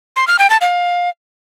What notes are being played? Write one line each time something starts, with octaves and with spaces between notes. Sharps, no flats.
C6
F6
G5
A5
F5